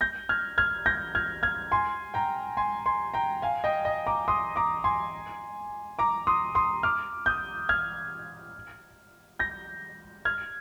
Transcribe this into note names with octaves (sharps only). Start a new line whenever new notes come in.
G6 A#6
F6 G#6
F6 G#6
G6 A#6
F6 G#6
F6 G#6
G#5 C6
G5 A#5
G#5 C6
G#5 C6
G5 A#5
F5 G#5
D#5 G5
D#5
A#5 D6
C6 D#6
A#5 D6
G#5 C6
A#5 D6
C6 D#6
C6 D#6
D6 F6
D#6 G6
F6 G#6
G6 A#6
F6 G#6